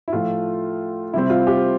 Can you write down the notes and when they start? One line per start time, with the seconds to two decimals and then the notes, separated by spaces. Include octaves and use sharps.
0.08 E4
0.13 A2 F3 A3 F4
1.13 C3 G3 C4 E4
1.30 F4
1.47 G4